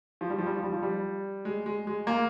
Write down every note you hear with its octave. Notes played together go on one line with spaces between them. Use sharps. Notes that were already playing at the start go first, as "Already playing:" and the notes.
F3
G3
F3
G3
F3
G3
F3
G3
G#3
G#3
G#3
A#3